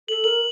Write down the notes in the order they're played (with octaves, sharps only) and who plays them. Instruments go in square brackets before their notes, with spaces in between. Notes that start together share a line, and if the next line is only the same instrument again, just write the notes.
[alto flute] A4 [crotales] F#7
[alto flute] A#4 [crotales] F#7